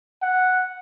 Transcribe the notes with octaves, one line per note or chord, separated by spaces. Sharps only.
F#5